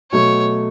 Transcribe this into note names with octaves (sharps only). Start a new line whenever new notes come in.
B2 F#3 A3 C#5